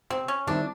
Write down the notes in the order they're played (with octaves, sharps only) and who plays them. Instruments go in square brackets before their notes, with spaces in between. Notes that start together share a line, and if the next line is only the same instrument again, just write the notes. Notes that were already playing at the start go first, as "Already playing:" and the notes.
[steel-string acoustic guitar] C3 [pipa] C4
[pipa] C#4
[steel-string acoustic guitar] D#3 G3 C4 E4 [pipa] D4